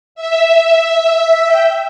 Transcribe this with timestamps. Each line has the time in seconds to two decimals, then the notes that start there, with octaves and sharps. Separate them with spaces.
0.15 E5
1.47 G5